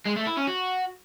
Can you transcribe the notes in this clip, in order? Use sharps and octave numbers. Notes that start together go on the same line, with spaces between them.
G#3
A3
E4
C#4
F#4